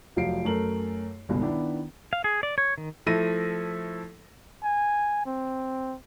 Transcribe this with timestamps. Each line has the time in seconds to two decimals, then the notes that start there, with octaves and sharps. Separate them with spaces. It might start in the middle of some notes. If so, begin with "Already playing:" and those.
0.16 F1 F3 F#3 F5 C7 D7
0.45 F#2 A3 A4 A#4 F#7
1.29 G1 C#2 B2
1.41 D#3 B3 D4 E4
2.13 F5
2.24 G#4
2.43 D5
2.58 C#5
2.78 D#3
3.06 F3 A3 E4 A4 A#6 D#7
4.63 G#5
5.26 C4